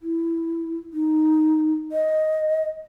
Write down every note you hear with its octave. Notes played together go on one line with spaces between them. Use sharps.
E4
D#4
D#5